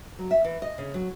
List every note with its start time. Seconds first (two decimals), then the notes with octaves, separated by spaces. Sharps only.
0.19 F#3
0.31 E5
0.44 E3
0.62 D#5
0.78 C#3
0.94 F#3